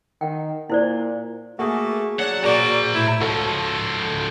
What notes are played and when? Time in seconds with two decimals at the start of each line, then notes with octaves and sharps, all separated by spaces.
0.21 D#3 F#5 G5
0.70 A#2 E4 C5 D5
1.59 A3 A#3 F#4 G#4
2.19 F#3 D4 F#5
2.44 A#3 F#4 G#4 C5 D5 A#5
2.94 A2 E4
3.21 C#2 F3 F#4 A4